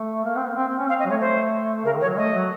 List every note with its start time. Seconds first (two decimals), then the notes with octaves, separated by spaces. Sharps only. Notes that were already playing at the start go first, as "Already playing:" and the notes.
Already playing: A3
0.25 A#3
0.36 C4
0.46 A#3
0.56 C4
0.68 C4
0.79 C#4
0.89 C4 F5
0.99 D#5
1.05 F#3
1.10 A3 C#5
1.21 C5
1.85 C#3 A#4
1.95 D#3
2.01 C#5
2.07 F#3
2.17 A3 D#5
2.33 F#3